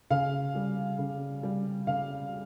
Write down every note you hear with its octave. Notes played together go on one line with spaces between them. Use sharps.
C#3 F5
G3
C#3
G3
C#3 F5